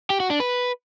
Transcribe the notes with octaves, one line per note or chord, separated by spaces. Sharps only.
G4
F#4
D4
B4